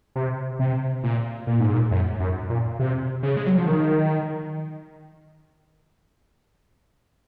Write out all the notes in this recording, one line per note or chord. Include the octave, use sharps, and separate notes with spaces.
C3
C3
A#2
A#2
G#2
A#2
F#2
F#2
A#2
C3
C#3
G#3
F#3
F3
D#3